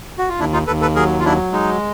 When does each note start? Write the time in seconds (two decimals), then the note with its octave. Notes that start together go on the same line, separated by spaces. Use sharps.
0.18 F#4
0.29 F4
0.39 D#2 D4 E4
0.53 D#4 F4
0.67 D#2 A4 B4
0.81 A4 B4
0.95 F#3 G#4 A#4
1.20 F4
1.25 F#3 D4 E4
1.53 G#3 D#4